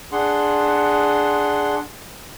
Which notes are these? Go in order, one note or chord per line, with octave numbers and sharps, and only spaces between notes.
D4 G#4 F#5 C6